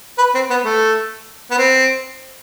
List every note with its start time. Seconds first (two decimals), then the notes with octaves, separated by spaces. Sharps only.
0.18 B4
0.34 C4
0.50 B3
0.65 A3
1.51 B3
1.58 C4